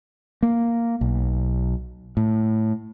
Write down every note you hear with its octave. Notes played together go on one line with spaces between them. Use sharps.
A#3
B1
A2